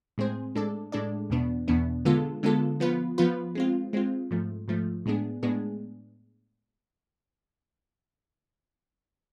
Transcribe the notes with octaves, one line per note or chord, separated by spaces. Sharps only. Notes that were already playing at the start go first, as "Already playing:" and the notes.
A2 G#3 C4 G#4 C5
A2 G#3 D4 A4 D5
A2 G#3 D4 A4 D5
E2 B2 B3 D4
E2 B2 B3 D4
D3 G#3 B3 F4 A4
D3 G#3 B3 F4 A4
F3 B3 F4 B4
F3 B3 F4 B4
G#3 C4 F4
G#3 C4 F4
G#2 F3 A3
G#2 F3 A3
A2 G#3 B3 D4 G#4
A2 G#3 B3 D4 G#4